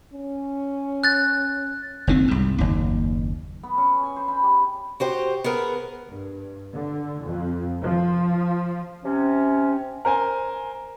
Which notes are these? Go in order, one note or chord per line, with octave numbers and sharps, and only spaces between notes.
C#4
F#6 A6
F#1 D#3 C4
C2 G#2
F#1 D#2
B3
C#4
G#5
C5
B5
G4
F#4 G4 C5
B3 G#4 A#4
G2
D3
F2
F3
C3 C#4
A#4 C5 G#5